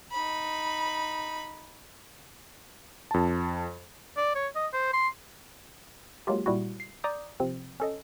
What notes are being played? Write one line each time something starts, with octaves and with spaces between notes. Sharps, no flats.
D#4 B5
F2 A5
D5
C#5
D#5
C5
C6
F#3 G#3 A#3 F4 G4
A#2 G3 E4 F#4
C7
D5 A#5 D6 D#6 G6
C3 F3 C4
C#4 A4 D#5